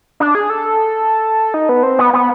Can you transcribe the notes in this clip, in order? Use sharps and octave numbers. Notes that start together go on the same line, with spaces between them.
D4
G#4
A4
D#4
B3
C4
B3
B3